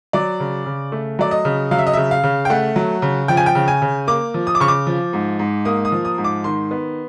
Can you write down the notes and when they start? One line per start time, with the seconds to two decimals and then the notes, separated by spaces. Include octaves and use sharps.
0.13 F#3 D5
0.40 C#3
0.66 C#3
0.92 A3
1.19 F#3 D5
1.31 D#5
1.45 C#3
1.71 F#3 F5
1.79 E5
1.87 D#5
1.93 C#3 E5
2.11 F5
2.24 C#3
2.45 G5
2.50 A3 F#5
2.76 F#3
3.02 C#3
3.28 F3 G5
3.37 G#5
3.46 G5
3.55 C#3
3.68 G#5
3.82 C#3
4.07 A#3 D6
4.34 F3
4.47 D#6
4.55 D6
4.60 C#3 C#6
4.68 D6
4.87 F3
5.13 G#2
5.39 G#2
5.65 A#3 D#6
5.85 D#6
5.92 F3
6.05 D#6
6.18 G#2
6.24 D6
6.44 D#3 C6
6.71 B3